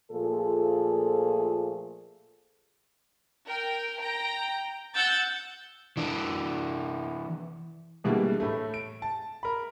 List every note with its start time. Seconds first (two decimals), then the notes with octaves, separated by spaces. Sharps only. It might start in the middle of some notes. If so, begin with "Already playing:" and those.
0.12 A#2 F3 A3 G#4 A4
3.48 A#4 G5
4.02 G5 A#5
4.95 F#5 E6 G6 A6
5.97 E3 D4
8.04 B2 E3 G3 G#3 A#3 D4
8.40 A2 A3
8.74 D7
9.02 A5
9.43 A#4 B5